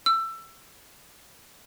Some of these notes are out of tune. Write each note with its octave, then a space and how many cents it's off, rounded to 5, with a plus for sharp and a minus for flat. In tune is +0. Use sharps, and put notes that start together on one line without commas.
E6 +20